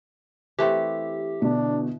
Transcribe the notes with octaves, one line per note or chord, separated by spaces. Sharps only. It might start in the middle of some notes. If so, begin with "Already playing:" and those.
E3 A3 C4 G4
B2 D3 D4